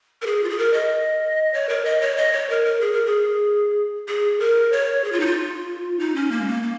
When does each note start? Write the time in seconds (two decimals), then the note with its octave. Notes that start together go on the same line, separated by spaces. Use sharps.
0.22 A#4
0.26 G#4
0.44 F4
0.50 G#4
0.58 A#4
0.73 D#5
1.54 C#5
1.69 A#4
1.85 D#5
2.01 C#5
2.17 D#5
2.33 C#5
2.50 A#4
2.65 A#4
2.81 G#4
2.93 A#4
3.06 G#4
4.08 G#4
4.40 A#4
4.72 C#5
5.04 G#4
5.12 F4
5.20 D#4
5.26 F4
5.99 D#4
6.15 C#4
6.32 A#3
6.41 G#3
6.47 A#3
6.63 A#3